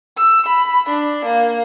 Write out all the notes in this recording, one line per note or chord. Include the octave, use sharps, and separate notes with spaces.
E6
B5
D4
A#3